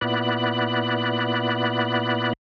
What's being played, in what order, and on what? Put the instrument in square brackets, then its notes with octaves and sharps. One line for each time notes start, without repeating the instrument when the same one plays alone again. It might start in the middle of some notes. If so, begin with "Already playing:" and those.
[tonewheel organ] A#2 B3 E4 D5 B5 F#6